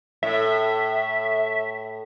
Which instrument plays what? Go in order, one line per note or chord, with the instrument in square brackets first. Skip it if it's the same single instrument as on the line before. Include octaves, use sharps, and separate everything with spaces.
[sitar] A2 [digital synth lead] E5